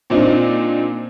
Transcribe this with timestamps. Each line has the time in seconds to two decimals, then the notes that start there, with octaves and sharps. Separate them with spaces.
0.10 A#2 C4 D4 D#4